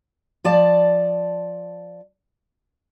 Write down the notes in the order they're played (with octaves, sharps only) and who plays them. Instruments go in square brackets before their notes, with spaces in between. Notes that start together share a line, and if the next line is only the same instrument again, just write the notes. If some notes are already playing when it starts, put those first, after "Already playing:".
[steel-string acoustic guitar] F3 D5 A5